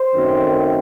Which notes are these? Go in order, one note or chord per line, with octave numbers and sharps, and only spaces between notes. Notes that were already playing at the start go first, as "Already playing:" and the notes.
Already playing: C5
F#2 D#3 A3 C4